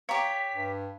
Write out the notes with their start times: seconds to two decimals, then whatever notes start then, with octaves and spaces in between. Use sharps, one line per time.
0.09 G4 C#5 F5 A#5 B6
0.54 G2